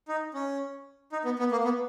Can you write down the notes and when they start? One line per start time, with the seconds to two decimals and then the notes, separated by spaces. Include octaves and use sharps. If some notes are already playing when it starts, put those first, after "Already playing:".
0.08 D#4
0.34 C#4
1.12 D#4
1.25 B3
1.39 B3
1.52 A#3
1.64 B3